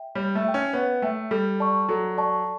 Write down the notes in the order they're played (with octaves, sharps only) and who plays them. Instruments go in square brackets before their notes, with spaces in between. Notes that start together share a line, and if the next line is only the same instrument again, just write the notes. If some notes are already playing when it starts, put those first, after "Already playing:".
Already playing: [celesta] E5 G5
[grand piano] G3 [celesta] C#5
[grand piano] A3
[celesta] E5 G5
[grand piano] C#4
[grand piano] B3 [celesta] C#5
[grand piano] A3 [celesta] E5 G5
[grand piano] G3 [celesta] A4
[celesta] D5 A5 C#6
[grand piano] F#3 [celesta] A4
[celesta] D5 A5 C#6